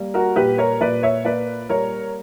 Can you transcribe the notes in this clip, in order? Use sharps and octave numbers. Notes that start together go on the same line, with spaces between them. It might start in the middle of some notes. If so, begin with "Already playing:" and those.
Already playing: G3 A#3
F#4 A#4
A#2 G4 B4
A#4 C#5
A#2 B4 D5
C#5 E5
A#3 B4 D5
G3 A#4 C#5